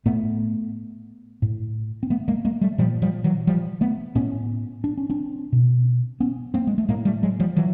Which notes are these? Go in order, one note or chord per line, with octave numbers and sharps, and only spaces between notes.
A2 A3 B3
A2
C4
A3 B3
G#3 A#3
G#3 A#3
G3 A3
A#2 F3 G3
F3 G3
E3 F#3
F3 G3
A3 B3
A2 B3 C#4
D4
C#4
C4 D4
B2
B3 C#4
A#3 C4
G#3
A3
A2 G#3 A#3
G3 A3
F#3 G#3
F3 G3
E3 F#3